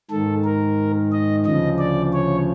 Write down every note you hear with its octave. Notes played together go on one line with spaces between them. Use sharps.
G#2 D#3 A4
A#4
D#5
D2 C#3 F3 D#5
D5
C#5